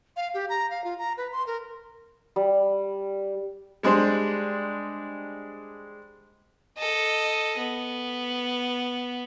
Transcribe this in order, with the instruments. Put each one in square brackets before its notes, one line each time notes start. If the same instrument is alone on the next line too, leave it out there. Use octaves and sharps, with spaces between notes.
[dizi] F5
G4
A#5
F5
F4
A#5
B4
C6
A#4
[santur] G3
[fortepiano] G3 G#3 D4 C5
[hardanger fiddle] A4 D#5
B3